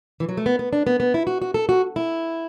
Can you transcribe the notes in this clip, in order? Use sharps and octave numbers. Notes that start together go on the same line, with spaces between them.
E3
F#3
A3
B3
B3
D4
B3
B3
E4
F#4
F#4
A4
F#4
E4